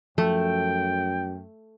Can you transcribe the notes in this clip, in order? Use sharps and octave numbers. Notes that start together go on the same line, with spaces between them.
F#2 F3 A3 G5